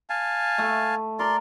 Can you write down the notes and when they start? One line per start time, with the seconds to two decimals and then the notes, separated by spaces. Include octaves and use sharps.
0.10 F5 G#5 A5
0.58 A3
1.19 A#4 D5 C6